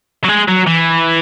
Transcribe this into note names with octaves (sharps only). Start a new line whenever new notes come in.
F#3
G#3
F#3
E3